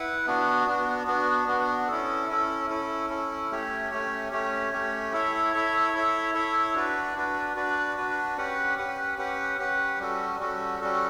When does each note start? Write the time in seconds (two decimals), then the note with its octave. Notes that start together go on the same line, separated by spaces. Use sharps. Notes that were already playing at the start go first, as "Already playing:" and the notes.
Already playing: E4 B4 F#5
0.27 B3 D4 F#4
0.67 B3 D4 F#4
1.07 B3 D4 F#4
1.48 B3 D4 F#4
1.88 C#4 E4 A4
2.30 C#4 E4 A4
2.70 C#4 E4 A4
3.10 C#4 E4 A4
3.51 A3 C#4 G4 C#5
3.91 A3 C#4 G4 C#5
4.32 A3 C#4 G4 C#5
4.72 A3 C#4 G4 C#5
5.12 E4 A4 C#5 E5
5.53 E4 A4 C#5 E5
5.94 E4 A4 C#5 E5
6.34 E4 A4 C#5 E5
6.75 D4 F#4 B4 D5
7.16 D4 F#4 B4 D5
7.56 D4 F#4 B4 D5
7.97 D4 F#4 B4 D5
8.37 C#4 G4 B4 F#5
8.78 C#4 G4 B4 F#5
9.18 C#4 G4 B4 F#5
9.59 C#4 G4 B4 F#5
9.99 G3 C#4 F#4 A4
10.40 G3 C#4 F#4 A4
10.80 G3 C#4 F#4 A4